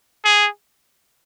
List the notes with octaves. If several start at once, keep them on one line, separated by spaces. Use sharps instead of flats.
G#4